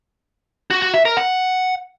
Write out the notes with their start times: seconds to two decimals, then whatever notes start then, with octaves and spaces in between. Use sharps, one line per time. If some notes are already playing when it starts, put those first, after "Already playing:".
0.70 F#4
0.82 F#4
0.94 E5
1.05 A#4
1.17 F#5